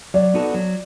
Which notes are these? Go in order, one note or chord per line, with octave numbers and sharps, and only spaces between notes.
F#3 D5
B3 D#4 F#4 A4
F#3